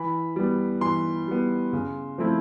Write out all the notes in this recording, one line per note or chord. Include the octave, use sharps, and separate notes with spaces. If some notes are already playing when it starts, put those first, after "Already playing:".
Already playing: E3 B5
G3 B3
E3 C6
G3 B3
C#3
F3 A3 C4 E4